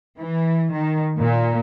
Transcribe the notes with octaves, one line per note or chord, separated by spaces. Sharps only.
E3
D#3
A#2